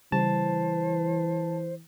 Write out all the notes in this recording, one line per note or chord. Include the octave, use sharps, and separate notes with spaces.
C#3 E3 G3 C5 A5